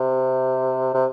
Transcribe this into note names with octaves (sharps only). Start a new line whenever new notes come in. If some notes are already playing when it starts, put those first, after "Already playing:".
Already playing: C3
C3